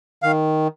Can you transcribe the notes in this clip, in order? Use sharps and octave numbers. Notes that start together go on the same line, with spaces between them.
D#3 F5